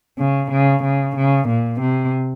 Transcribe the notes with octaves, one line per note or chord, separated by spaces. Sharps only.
C#3
C#3
C#3
C#3
A#2
C3